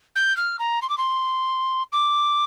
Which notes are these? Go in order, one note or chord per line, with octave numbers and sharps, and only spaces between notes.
G6
F6
A#5
C6
D6
C6
D6